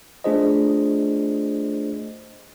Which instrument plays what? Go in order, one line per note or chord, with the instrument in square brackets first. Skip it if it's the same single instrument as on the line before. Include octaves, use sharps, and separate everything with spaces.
[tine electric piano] A3 D4 F4 G#4 C5 D#5